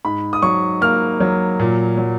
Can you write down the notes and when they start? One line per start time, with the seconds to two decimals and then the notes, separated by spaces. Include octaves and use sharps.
0.05 G#2 B5
0.33 D#6
0.42 F#3 C#6
0.81 A#3 F6
1.20 F#3
1.59 A#2
1.97 F#3